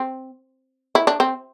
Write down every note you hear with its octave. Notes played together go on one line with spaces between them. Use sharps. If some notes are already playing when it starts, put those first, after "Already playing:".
Already playing: C4
E4
D4
C4